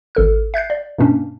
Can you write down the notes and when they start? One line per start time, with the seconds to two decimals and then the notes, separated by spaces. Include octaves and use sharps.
0.15 G#1 A4 F6
0.54 E5 F#6 G6 C7
0.70 D5
0.99 G2 B2 A#3 C#4 D4